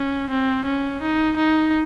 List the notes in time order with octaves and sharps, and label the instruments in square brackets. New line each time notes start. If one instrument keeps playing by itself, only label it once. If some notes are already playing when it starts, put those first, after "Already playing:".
Already playing: [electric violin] C#4
C4
C#4
D#4
D#4